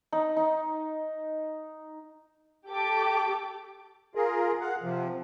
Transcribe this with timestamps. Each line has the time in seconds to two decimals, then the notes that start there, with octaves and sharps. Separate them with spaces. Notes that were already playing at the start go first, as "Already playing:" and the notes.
0.13 D#4
0.36 D#4
2.69 G4 A4 D6
4.15 F4 G#4 A#4
4.60 F5 F#5
4.82 C3 F3